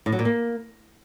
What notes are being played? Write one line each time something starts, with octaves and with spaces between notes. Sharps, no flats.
A2
F#3
A#2
A#3